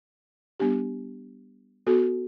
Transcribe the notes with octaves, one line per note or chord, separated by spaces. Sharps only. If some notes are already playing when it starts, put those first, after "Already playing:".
G3 B3 D4 G4
B3 F#4 A4